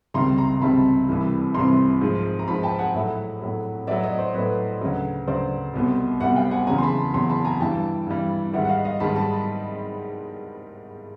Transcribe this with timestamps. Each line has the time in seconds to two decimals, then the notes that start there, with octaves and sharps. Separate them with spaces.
0.14 C#2 C3 D#3 G3 A#5 C6
0.38 A#5 C6
0.56 A#5
0.61 C#2 C3 D#3 G3 A5 B5
1.08 C2 C3 E3 G3
1.54 C2 C3 E3 G3 A#5 C6
2.01 G#2 F3
2.39 A#5
2.47 G#2 F3 A5 B5
2.63 G5 A5
2.79 F#5 G#5
2.94 A2 F#3 E5 F#5
3.41 A2 F#3
3.87 A2 F#3 D5 E5
4.03 C#5 D#5
4.18 C5 D5
4.34 A2 F#3 B4 C#5
4.81 D2 C#3 F#3
5.28 D2 C#3 F#3 C5 D5
5.74 C2 B2 G3
6.20 C2 B2 G3 E5 F#5
6.36 F5 G5
6.51 F#5 G#5
6.67 E2 C#3 F#3 G#5 A#5
6.78 C6
6.83 A5 B5
7.14 E2 C#3 F#3 A#5 C6
7.29 A5 B5
7.40 A5
7.45 G#5 A#5
7.61 G2 E3 G3 G5 A5
8.07 G2 E3 G3
8.53 G#2 D#3 G3 E5 F#5
8.65 F#5
8.69 D#5 F5
8.85 D#5 F5
9.00 G#2 D#3 G3 A5 B5
9.16 A5 B5